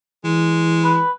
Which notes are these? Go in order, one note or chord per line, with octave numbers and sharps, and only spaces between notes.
E3 G#3
B4